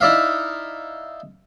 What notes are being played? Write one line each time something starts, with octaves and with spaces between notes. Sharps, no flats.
D#4 E4 D5 E5 F5